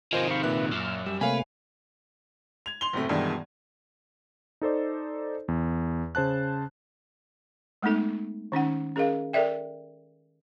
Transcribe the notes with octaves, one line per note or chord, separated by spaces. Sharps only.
C3 D#3 F4 A#4 C5 D#5 G#5
F5 B5 C#6
A#2 B4 E5 F#6
F#2 E6 F6
G3 E6
C3 A3 A#3 B4 C#5 F5 G#5
G#6 F7
C6 F7 G7
F#1 A2 C3 A3
G2 B2 D#3 E3 G3 G#3
D#4 A4 C5 D5
E2
C#3 C5 A5 F#6
G#3 A3 B3 D#4 A4
D#3 C#4 D#4 F#5
C#4 G#4 A#4 D#5 F5
A4 A#4 D5 E5 G5